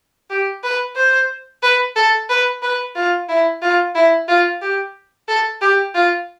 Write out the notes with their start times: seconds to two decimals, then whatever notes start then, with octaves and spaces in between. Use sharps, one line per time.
0.30 G4
0.63 B4
0.96 C5
1.63 B4
1.96 A4
2.29 B4
2.62 B4
2.95 F4
3.29 E4
3.62 F4
3.95 E4
4.28 F4
4.62 G4
5.28 A4
5.61 G4
5.95 F4